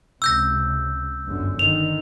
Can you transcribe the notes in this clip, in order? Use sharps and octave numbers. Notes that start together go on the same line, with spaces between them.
C#2 C3 E6 G6 A#6
G1 F#2 D3
D3 D#3 F7